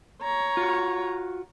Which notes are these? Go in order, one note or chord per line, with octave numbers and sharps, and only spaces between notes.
C#5 A#5
F4 F#4